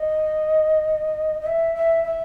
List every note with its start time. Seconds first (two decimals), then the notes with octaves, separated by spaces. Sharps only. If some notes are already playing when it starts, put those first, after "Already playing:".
Already playing: D#5
1.41 D#5
1.46 E5
1.75 E5
2.04 E5